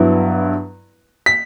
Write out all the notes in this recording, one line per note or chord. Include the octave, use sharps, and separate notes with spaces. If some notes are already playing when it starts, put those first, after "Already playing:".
Already playing: G2 F#3 B3 E4
B6